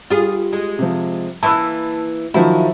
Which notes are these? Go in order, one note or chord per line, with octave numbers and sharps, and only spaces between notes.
G3 F4 G#4
G#3
C3 F3
E3 A#3 A5 B5 E6
D#3 F3 F#3 E4